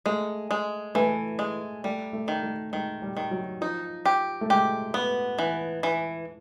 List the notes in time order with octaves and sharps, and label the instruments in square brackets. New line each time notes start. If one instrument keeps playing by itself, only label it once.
[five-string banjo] G#3 [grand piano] A3
[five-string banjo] G#3
[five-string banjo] E3 [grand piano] A3
[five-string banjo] G#3
[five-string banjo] G3 [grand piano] A3
[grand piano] A3
[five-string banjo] D#3
[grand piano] A3
[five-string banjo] D#3 [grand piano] G#3
[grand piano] G3
[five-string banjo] D#3
[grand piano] F#3
[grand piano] F3 [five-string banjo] D#4
[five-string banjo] G4
[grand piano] A3
[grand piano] G#3 [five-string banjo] G4
[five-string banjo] B3
E3
E3